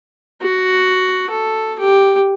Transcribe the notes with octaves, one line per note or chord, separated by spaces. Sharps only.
F#4
A4
G4